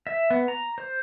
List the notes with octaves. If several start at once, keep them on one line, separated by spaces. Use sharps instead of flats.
E5
B3
A#5
C5